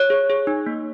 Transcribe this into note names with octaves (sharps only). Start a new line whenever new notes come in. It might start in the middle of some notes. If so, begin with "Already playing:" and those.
Already playing: C#5
G#4
G#4
D#4
A#3